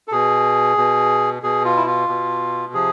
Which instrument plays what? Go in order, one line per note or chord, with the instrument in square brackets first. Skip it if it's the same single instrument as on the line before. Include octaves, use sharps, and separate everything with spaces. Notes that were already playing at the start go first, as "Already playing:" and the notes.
[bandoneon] A4
B2 G#4
B2
B2 G#4
F4
E4
F4
B2
C3 F3 G#4